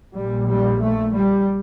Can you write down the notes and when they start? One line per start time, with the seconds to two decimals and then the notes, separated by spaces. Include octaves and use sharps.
0.17 A#1 A#2 G3
0.49 G3
0.82 A3
1.14 G3